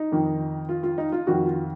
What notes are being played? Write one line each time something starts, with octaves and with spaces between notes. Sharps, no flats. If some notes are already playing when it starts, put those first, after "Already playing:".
Already playing: D#4
F2 D#3
F4
F4
D#4
F4
F2 D#3 F#4
F4